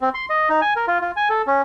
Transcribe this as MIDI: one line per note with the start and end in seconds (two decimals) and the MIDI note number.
0.01 0.09 60
0.14 0.26 84
0.30 0.49 75
0.49 0.60 63
0.62 0.74 80
0.76 0.86 70
0.88 0.98 65
1.02 1.11 65
1.17 1.29 80
1.30 1.42 69
1.47 1.62 61